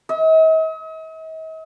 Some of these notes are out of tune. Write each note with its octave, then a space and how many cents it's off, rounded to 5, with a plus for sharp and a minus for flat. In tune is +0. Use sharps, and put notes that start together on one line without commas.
D#5 +45